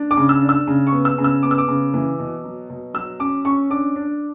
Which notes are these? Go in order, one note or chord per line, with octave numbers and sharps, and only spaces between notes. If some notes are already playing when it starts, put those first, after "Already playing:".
Already playing: D4
D6
C#3
E6
D4
E6
C#3
C#6
B3
E6
C#3
E6
B3 D6
E6
D6
C#3
E3
B2
F#3
B2
F#3 E6
C#4 D6
C#4 C#6
D4 D6
D4